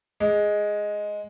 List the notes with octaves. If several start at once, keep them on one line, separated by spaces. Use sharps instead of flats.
G#3